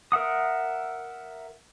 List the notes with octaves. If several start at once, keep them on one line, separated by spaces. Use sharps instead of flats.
A#4 E5 F#5 D#6